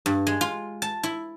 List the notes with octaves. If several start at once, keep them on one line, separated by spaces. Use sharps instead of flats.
G2
G#3
F4
A5
E4